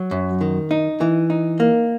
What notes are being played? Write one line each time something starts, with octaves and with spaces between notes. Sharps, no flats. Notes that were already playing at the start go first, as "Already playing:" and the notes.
Already playing: F#3
F#2
D#3
D#4
E3
D#4
A#3